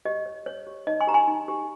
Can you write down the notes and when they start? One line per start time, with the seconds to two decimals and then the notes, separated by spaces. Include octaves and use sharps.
0.05 G4 D#5
0.26 C#5
0.46 C#5
0.67 G4
0.87 D#4 D#5
1.01 G#5 C6
1.07 G4 A#5
1.14 G#5 C6
1.28 D#4
1.48 G4